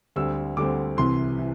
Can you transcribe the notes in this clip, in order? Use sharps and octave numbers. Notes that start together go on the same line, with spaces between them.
D2 D3 G3 C4 E6
D2 D3 G3 C4 D6
C2 C3 E3 C6
E3